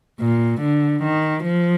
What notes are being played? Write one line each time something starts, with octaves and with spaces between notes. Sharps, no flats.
A#2
D3
D#3
F3